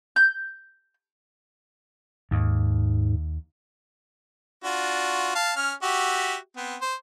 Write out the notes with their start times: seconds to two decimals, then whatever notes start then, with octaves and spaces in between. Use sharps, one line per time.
0.16 G6
2.31 D#2 G#2
4.64 D4 F4 F#4
5.35 F5 A5
5.56 C#4 F6
5.83 F#4 G4 E5
6.57 B3 C4
6.82 C5